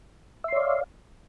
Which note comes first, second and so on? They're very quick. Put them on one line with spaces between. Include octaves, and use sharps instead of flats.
E5 C6 C#5 D5 F5